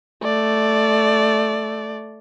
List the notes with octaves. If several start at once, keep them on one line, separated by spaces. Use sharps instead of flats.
A3 D5